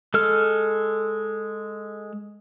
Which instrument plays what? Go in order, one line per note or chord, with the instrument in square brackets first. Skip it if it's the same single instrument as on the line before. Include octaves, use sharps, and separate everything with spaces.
[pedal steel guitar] G#3 A4 F6